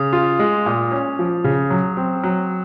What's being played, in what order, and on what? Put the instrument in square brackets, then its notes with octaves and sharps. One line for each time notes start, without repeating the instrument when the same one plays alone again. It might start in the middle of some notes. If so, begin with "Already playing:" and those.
Already playing: [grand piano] C#3 [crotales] D#6
[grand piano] F4
G#3
A#2
C#4
F3
C#3
F#3
C4
F#3